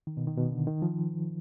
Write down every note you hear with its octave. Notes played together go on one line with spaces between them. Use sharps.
D#3
B2
D#3
B2
D3
D#3
F3